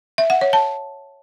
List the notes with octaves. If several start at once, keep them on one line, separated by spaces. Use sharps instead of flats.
E5
F#5
C#5
A5